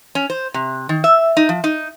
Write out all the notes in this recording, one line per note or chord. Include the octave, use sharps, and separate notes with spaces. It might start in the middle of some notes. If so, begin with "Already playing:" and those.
C#4
C5
C3
D#3
E5
D#4
F3
D#4